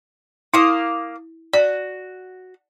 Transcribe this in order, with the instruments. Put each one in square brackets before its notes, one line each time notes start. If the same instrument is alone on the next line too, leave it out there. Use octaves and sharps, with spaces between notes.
[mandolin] A#3 F5 D#6 [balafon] E4
[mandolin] F#4 [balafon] D5